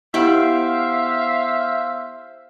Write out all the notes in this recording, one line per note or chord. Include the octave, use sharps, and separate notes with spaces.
B3 E4 G4 C5 E5 F5 B5 D7